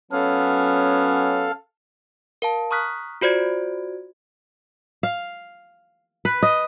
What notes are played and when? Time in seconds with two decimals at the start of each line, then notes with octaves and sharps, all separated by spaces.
0.12 F#3 B3 C#4 A4 F5
2.42 A#4 F5 A5
2.71 A#5 C#6 D#6 F6 F#6 B6
3.21 F4 F#4 C5 D5 G#6 D7
5.03 F5
6.25 B4
6.43 D#5